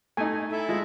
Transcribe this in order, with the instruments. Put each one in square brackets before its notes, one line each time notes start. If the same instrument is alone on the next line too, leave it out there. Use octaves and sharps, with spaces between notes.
[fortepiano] A3 D#4 [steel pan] G#5
[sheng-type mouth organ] E4 A4 E5
[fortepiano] G#3 [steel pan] F4